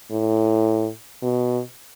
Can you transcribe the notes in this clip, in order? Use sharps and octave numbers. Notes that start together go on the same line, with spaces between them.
A2
B2